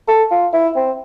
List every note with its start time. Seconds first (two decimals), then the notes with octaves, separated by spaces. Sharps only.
0.08 A4
0.31 F4
0.53 E4
0.76 C4